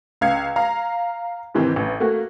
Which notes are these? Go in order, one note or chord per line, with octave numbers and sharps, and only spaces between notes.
C#2 F5 G#6 C#7
F5 A#5
G#2 C3 D#3 E3 C4
A1
A3 A#3 F#4